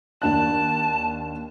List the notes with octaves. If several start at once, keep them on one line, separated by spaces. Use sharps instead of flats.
D#2 D4 A5 F#6